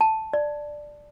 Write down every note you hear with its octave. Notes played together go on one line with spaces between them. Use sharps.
A5
D5